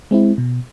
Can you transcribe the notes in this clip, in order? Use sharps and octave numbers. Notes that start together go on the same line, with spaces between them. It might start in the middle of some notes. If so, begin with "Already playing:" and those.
G#3 C4 E4
B2